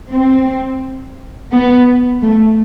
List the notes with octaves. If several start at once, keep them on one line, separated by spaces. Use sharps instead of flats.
C4
B3
A3